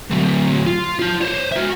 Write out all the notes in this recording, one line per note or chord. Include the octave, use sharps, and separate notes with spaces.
D2 F#3
F4
F4 A5
C5 C#5
F#4 E5